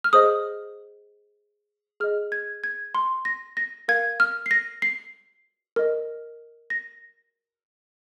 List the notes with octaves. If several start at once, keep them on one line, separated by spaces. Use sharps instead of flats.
F6
G#4 C5 D#5 D#6
G#4 D#5 F6
G#6
G#6
C6
A#6
A#6
A#4 F5 G#6
F6
C7
A#6
C7
A#4 D#5
A#6